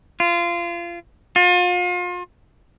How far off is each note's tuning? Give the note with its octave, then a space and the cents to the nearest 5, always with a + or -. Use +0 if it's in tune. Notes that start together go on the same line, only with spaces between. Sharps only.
F4 -25
F4 +35